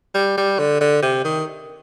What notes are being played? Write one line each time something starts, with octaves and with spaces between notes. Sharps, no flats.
G3
G3
D3
D3
C3
D#3